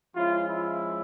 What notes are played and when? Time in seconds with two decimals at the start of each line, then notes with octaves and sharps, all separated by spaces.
0.15 F3 G#3 C#4 E4 F4
0.47 E4